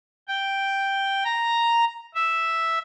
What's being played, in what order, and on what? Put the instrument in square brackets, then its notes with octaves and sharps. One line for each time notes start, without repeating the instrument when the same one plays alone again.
[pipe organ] G5
A#5
E5